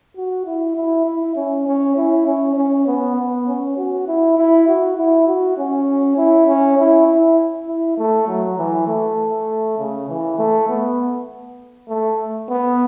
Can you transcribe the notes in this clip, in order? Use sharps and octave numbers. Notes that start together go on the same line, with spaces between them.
F#4
E4
E4
E4
C#4
C#4
E4
C#4
C#4
B3
B3
C#4
F#4
E4
E4
F#4
E4
F#4
C#4
E4
C#4
E4
E4
E4
A3
F#3
E3
A3
C#3
E3
A3
B3
A3
B3